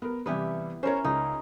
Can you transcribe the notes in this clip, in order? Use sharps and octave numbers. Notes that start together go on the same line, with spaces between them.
B3 A#4
C3 E3 G3 B3 E4 G4
C#4 E4 A#4 C5 C#5
C#2 D#4